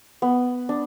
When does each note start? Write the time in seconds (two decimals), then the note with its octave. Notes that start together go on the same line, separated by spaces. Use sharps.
0.22 B3
0.69 D4